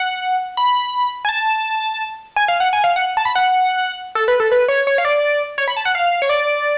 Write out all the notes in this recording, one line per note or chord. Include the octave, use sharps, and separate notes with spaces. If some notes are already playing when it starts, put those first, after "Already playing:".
Already playing: F#5
B5
G#5
A5
G#5
F5
F#5
G#5
F5
F#5
A5
B5
F#5
A4
B4
A4
B4
C#5
C#5
F5
D5
C#5
B5
A5
F#5
F5
C#5
D5